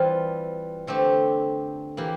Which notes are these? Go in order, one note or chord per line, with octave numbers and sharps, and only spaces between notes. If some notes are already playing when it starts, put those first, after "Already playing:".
Already playing: E3 G3 C4 F4
D3 A3 C4 G4
E3 A#3 E4 G4